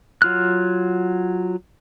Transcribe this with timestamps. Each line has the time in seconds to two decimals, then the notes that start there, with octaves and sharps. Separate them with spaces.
0.22 F#3 F4 F6 F#6